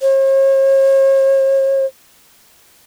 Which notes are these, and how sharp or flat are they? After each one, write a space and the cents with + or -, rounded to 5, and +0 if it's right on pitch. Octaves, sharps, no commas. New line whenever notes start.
C#5 -45